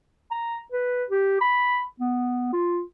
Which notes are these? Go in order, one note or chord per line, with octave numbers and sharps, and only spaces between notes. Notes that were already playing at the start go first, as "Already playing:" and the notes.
A#5
B4
G4
B5
B3
F4